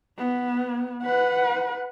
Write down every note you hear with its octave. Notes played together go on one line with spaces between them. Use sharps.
B3
B4 F#5